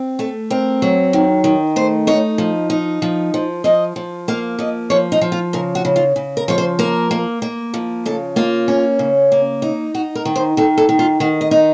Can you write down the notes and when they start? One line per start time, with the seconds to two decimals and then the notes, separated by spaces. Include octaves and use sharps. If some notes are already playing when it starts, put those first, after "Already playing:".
Already playing: C4
0.19 A3 A4
0.50 C4 A#4
0.82 F#3
1.13 D#3
1.44 D#3
1.76 A3 C5
2.07 D#4 C#5
2.38 F3
2.70 D#4
3.02 F3
3.34 F3
3.64 F3 D#5
3.96 F3
4.28 A#3 F5
4.59 F3 D#5
4.90 F3 C#5
5.12 D#4
5.21 F3
5.32 F4
5.53 C#3 A#4
5.75 F#4
5.85 C#3
5.96 F4
6.16 C#3
6.37 A#4
6.48 F3 C#5
6.58 C5
6.79 A#3 A#4
7.11 A#3
7.42 A#3
7.74 F3
8.06 C#3 A4
8.36 A#3 F4
8.68 C#4
8.99 C#3
9.32 A#3
9.62 D#4
9.94 D#4 F#4
10.15 A#4
10.25 D#3
10.36 C5
10.57 D#3 A4
10.78 A4
10.89 D#3
10.99 F4
11.20 D#3 F#4
11.41 D#5
11.51 D#4